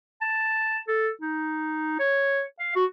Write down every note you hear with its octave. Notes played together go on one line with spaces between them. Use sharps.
A5
A4
D#4
C#5
F5
F#4